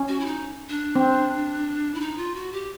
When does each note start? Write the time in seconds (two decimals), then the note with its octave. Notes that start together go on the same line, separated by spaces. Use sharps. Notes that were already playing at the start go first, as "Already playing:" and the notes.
Already playing: C#4
0.08 F#4
0.20 E4
0.26 D#4
0.69 D4
0.96 C4
1.94 E4
2.00 D#4
2.17 F4
2.35 F#4
2.52 G4